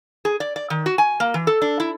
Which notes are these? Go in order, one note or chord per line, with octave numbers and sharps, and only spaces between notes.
G#4
D5
D5
D#3
F#4
G#5
A#3
E3
A4
D4
E4